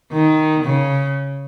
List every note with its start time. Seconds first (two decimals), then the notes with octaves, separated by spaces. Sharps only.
0.12 D#3
0.63 C#3